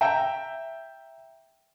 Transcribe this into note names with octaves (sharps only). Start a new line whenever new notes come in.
E5 G5 A#5